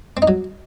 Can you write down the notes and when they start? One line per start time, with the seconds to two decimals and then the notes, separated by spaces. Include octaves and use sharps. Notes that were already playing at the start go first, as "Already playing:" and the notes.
0.17 C4
0.22 D#4
0.28 F#3